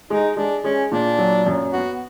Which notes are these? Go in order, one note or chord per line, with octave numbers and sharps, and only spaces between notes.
G#3 D#4
G#3 D4
G#3 C#4
A#2 D4
F#3
F#2
B3 F#4